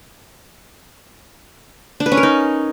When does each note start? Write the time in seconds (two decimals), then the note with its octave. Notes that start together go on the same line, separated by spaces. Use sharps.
2.00 D4
2.06 B4
2.12 C#4
2.17 A#4
2.23 D#4